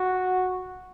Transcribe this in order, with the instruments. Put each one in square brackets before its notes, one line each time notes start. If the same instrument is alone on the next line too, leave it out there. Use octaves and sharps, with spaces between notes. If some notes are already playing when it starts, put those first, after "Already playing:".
Already playing: [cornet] F#4